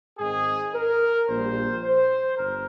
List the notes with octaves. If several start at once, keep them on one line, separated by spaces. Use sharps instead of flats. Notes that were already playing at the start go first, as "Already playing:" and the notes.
G#2 D#3 G#3 C4 G#4
A#4
A#1 A#2 G3 C5
C5
G1 A#4